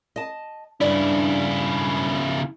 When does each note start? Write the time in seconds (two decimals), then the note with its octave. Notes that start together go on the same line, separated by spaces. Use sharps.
0.16 D#5 A5
0.81 G2 C#3 D4 E4 D5
1.78 F#2